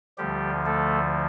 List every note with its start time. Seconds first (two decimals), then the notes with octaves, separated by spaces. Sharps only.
0.18 D2 D3 F3 G3 G4
0.66 A3 A4